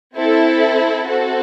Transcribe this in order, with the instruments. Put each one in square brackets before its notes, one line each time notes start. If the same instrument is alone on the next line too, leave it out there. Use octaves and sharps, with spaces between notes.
[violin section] C4 E4 A4
C4 F#4 A4